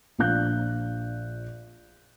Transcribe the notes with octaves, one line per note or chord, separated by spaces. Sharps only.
A#1 F3 D4 F5 F#6 G6